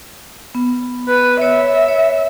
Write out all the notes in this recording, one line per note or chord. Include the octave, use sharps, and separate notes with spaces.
B3
B4
C#5 E5
C#5